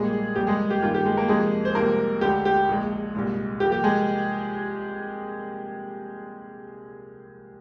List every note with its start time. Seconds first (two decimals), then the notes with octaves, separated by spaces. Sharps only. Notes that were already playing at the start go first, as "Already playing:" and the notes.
Already playing: A#1 A#2 G3 G#3 A#3 G#4
0.36 F2 C3 G3 A#3 G4
0.47 G#3 G#4
0.70 G4
0.82 G1 G2 D#3 A#3 F4
0.94 G4
1.05 G#3 G#4
1.17 A#3 A#4
1.28 F2 C3 F3 G#3 A#3 G#4
1.65 C5
1.75 C2 C3 F3 G#3 A#3 A#4
2.21 D2 D3 G#3 G4
2.45 G4
2.69 A#1 A#2 F3 G#3
3.15 C2 A#2 G#3
3.60 C2 C3 F3 A#3 G4
3.72 G4
3.84 G#3 G#4